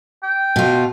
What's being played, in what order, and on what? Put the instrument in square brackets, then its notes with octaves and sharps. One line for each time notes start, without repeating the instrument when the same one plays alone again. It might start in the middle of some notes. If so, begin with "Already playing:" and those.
[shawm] G5
[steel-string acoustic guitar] B2 F4